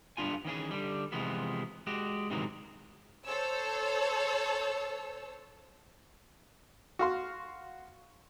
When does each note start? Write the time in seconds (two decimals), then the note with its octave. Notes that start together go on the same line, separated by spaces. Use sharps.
0.17 G2 B3 D4 F4 G#5
0.45 D#3 E3 C#4 G#4
0.71 D3 G3
1.12 C3 E3 F3 G#3 B3
1.87 G#3 F#4 G4
2.30 G#2 C3 D#3 E3 F#3 G#3
3.25 A4 C5 C#5 E6
6.99 F#4 F5 C6